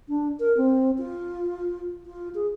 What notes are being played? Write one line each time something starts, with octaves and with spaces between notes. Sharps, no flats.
D4
A#4
C4
F4
F4
G#4